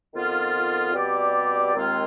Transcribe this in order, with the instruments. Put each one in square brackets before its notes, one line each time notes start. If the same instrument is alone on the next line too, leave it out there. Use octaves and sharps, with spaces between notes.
[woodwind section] F2 D#3 B3 F4
B2 G3 C4 G4 D5
D#2 D#3 G#3 C4 F4